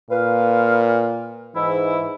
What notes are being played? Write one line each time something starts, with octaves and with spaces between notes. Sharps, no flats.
A#2 B4 F5
G#2 E3 E4